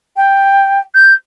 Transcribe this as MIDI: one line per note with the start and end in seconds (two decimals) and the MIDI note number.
0.16 0.79 79
0.94 1.13 91